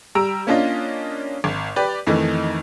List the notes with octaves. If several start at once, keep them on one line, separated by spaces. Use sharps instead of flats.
G3 A#5 E6 D7
A#3 C#4 D4 F4 D#5
G#1
G4 B4 D5
F2 D#3 E3 A3 D#4